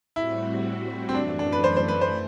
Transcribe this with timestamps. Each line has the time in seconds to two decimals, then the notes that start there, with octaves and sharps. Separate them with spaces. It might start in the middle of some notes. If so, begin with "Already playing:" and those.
0.16 A2 G3 C4 E4 F#4
1.09 C4
1.15 F#2 E3 A3 D4
1.39 D4
1.52 B4
1.64 C5
1.77 C5
1.88 B4
2.01 C5